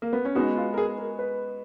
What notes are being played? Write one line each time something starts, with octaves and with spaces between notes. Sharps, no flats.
A#3
B3
C#4
G#3 B3 D#4 F#4
F4
A#4
G#4
A#4
B4